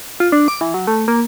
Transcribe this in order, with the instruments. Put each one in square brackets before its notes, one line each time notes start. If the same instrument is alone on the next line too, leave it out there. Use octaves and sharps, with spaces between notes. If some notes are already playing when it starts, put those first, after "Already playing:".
[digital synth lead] F4
D4
D6
E3
F#3
A3
A#3